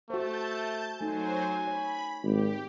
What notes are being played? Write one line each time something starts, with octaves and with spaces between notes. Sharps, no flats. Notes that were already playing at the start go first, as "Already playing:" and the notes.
A3 F#4 C5 A5 G6
F#3 A3 D#4 C5 G#5
C#5 B5
G#1 G4